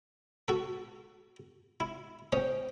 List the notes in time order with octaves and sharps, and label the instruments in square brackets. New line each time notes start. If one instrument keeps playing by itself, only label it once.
[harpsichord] F#4 A4
E4
[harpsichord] C#4 D#5 [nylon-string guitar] C5 G5